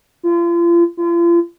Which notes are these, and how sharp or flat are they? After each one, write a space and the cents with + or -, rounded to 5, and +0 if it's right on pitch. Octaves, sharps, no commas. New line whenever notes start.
F4 -35
F4 -40